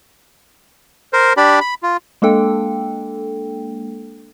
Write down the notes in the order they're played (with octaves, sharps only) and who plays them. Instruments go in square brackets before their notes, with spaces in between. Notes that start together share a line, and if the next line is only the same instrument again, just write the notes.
[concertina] A#4 C5
D4 G4 D5 B5
B5
F4
[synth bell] G#3 A#3 D4 A4 G5